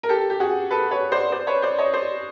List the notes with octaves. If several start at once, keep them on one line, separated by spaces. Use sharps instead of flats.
A#4
G4 A4
G4
F#4 G#4
A4 B4
B4 C#5
C5 D5
C5 D5
B4 C#5
C5 D5
C#5 D#5
C5 D5